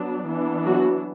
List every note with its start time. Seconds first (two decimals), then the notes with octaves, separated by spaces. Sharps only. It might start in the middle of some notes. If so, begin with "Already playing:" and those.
Already playing: F#3 B3 D4
0.29 E3 B3 D4
0.65 F#3 F#4